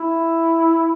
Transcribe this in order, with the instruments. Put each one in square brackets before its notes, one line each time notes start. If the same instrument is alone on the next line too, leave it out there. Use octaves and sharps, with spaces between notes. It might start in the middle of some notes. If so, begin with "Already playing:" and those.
Already playing: [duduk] E4